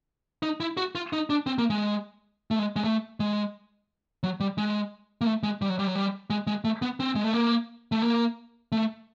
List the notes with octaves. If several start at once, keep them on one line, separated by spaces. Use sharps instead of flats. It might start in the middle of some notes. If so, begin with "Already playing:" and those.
D#4
E4
F#4
F4
D#4
D4
C4
A#3
G#3
A3
G#3
G#3
A3
G#3
F#3
G3
G#3
A#3
A3
G#3
G3
F#3
G3
F#3
G3
G#3
G#3
A3
B3
C4
G#3
A3
A#3
A3
A#3
A3